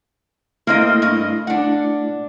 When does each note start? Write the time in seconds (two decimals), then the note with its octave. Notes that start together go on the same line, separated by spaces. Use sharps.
0.67 A3 A#3 C4 E4 D#5
1.02 G2 D#5
1.47 D4 F#5